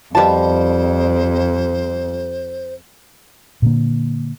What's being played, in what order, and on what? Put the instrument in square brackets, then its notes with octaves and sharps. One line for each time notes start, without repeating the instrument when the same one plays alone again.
[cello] F2 [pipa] B2 A5 [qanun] F3 G3 F4 [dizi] C5
[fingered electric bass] A#2 D3 A#3